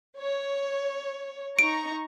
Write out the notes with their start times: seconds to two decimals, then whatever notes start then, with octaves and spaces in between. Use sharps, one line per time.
0.20 C#5
1.59 D#4 A#5 C#6 D7